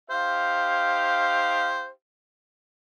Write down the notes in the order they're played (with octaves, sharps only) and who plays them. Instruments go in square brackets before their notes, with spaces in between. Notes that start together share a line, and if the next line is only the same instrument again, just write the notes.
[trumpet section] D#4 G4 F5 [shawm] C5